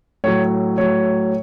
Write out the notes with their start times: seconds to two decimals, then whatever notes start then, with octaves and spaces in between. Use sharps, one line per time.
0.24 A2 F#3 C#5
0.78 A2 F#3 C#5